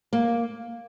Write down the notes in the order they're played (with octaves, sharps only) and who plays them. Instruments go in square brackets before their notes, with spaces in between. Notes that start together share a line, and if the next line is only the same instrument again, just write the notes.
[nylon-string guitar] A#3